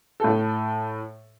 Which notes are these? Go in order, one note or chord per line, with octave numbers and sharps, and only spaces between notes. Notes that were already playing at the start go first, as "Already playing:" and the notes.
A2 A4